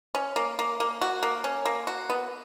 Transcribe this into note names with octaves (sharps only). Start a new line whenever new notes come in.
C#4
A#3
A#3
A#3
F#4
A#3
C#4
A#3
F#4
B3